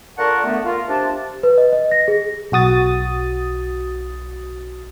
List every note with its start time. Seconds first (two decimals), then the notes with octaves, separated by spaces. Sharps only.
0.18 A#2 D3 A#4 F#5 A5 C#6
0.45 D3 A3 B3
0.65 F4 A#4
0.89 C3 F3 D4 G4 A5
1.43 B4
1.58 D#5
1.73 D#5
1.92 A#6
2.08 G#4
2.52 B1 F#4 D#6 A6